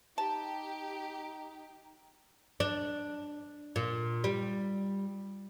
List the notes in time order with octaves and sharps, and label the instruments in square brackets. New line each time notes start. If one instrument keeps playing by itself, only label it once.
[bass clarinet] D#4 [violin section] G4 [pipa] A5
[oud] D4
A#2
G3